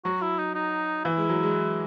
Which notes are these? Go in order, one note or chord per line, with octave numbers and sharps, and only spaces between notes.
F#3 F#4
E4
D#4
D#4
E3 E4
G#3
F#3
G#3